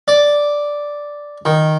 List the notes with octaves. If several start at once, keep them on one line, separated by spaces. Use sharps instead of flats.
D5
D#3